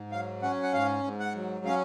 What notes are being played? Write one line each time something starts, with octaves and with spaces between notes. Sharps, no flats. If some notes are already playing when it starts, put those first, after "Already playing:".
Already playing: G#2
F#3 F5
C#4 F#5
F#5
G#2 F5
G#2
F#5
F#3
C#4 F5